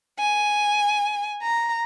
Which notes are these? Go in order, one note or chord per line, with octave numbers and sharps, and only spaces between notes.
G#5
A#5